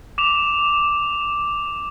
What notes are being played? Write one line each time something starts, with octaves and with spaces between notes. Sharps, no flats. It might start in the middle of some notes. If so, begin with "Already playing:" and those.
D6 E7 F7